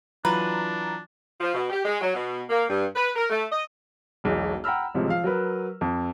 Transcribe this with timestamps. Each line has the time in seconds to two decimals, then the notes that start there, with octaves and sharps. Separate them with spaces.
0.25 E3 F#3 D4 F4 B4 A#5
1.40 F3
1.54 B2
1.70 G4
1.85 G#3
2.01 F#3
2.15 B2
2.50 A#3
2.69 G2
2.95 B4
3.16 A#4
3.30 A3
3.51 D#5
4.24 E1 B1 E2
4.64 F#5 G5 A#5 B5 E6 F6
4.94 A1 C3 F3 G#3
5.07 F3 F5
5.24 F#3 A#4 B4
5.81 F2